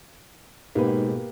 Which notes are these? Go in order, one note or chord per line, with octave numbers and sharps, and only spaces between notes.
G#2 B2 A#3 G4 B4